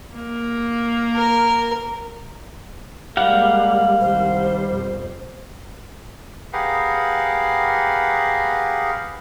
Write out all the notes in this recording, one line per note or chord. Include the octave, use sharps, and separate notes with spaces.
A#3
A#4
G3 G#3 A#3 F5 F#5
C2 D#3 C5
F2 B2
G4 G#4 A#4 B4 F5 F#5